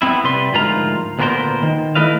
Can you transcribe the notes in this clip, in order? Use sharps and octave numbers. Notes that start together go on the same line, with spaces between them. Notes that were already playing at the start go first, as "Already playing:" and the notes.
B3 C4 E4
C3 G3 B4 C6
D2 G#2 F3 F4 A#4 A#5
D2 A#2 B3 C#4 A#4 C5
D#3
A3 E4 A4 B4 D#5 F5